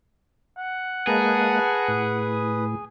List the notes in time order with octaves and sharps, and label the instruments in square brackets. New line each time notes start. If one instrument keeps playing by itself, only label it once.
[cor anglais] F#5
[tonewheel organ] G#3 A#3 [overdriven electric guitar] G#4 [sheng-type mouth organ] B4 A5 A#5
[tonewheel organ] A2 [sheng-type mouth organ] B4 D#6